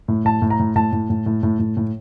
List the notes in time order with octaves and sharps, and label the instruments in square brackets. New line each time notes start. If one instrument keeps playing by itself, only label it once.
[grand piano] A2
A2 A5
A2
A#5
A2
A2 A5
A2
A2
A2
A2
A2
A2